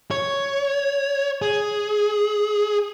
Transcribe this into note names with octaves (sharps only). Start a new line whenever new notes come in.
C#5
G#4